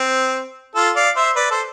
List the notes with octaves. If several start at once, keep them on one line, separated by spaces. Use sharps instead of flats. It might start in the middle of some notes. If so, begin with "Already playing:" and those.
Already playing: C4
F4 A4
D5 F5
C5 E5
B4 D5
A4 C5